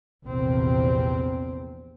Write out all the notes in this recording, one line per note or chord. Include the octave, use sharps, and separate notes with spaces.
A#1 E2 C3 C4